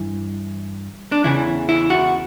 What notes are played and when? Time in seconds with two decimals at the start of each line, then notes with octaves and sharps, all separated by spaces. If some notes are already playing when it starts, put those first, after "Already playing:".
Already playing: G2 E3
1.12 D4
1.24 E2 C#3 E3 E4
1.69 E4
1.90 F#4